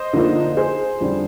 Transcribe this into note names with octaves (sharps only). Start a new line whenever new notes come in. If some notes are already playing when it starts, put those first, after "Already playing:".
Already playing: C5 D#5
D3 F3 A#3 D#4
G#4 C5
F2 D3 G3 D4